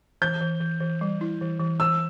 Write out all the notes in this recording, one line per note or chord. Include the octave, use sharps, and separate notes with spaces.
E3 G6
E3
E3
E3
G3
E4
E3
E3
E3 E6